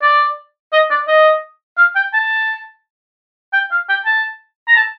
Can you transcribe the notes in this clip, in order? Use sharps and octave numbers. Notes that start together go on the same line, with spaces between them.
D5
D#5
D5
D#5
F5
G5
A5
G5
F5
G5
A5
A#5
A5